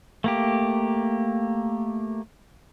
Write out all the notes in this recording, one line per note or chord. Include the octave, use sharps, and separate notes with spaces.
A3 A#3 G4